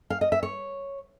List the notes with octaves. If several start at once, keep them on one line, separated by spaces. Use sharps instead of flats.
F5
D#5
E5
C#5